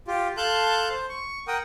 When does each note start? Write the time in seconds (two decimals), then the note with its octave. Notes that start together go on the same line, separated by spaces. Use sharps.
0.07 F4 G4
0.37 A4 F5 A5 C6 F#6 G6
0.90 C5
1.09 C#6
1.48 A#4 F#5 G5 D#6